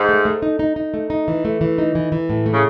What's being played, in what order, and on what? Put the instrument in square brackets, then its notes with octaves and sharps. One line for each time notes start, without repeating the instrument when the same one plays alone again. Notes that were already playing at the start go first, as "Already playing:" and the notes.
Already playing: [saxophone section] G#2
[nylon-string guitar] A3
A3
D#4
D#4
D#4
A3
D#4
E3
A3
E3
D#4
E3
E3
A2
A3
[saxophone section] C#3